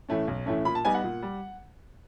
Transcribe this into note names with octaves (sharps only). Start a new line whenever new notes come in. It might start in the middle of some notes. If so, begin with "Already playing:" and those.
A2 E3 A3 C#4
B1
A2 E3 A3 C#4
A#2 B5
A5
G3 B3 D#4 G#5
F#5
A#2
G3